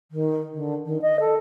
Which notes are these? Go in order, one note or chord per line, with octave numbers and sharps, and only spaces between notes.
D#3
D3
D#3
D#5
A4